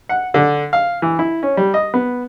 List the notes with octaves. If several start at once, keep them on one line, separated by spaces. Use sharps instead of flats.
F#5
D3
F5
E3
E4
C#4
G3
D#5
B3